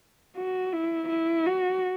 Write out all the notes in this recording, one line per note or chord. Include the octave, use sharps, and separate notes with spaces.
F#4
E4
E4
F#4